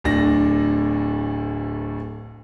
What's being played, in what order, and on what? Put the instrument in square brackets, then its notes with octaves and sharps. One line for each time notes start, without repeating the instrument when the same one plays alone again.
[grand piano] D1 D2 D4 A#6